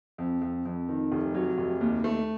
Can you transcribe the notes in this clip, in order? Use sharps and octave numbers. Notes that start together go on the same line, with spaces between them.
F2
F2
F2
D#3
F1
F#3
F1
D#2
A3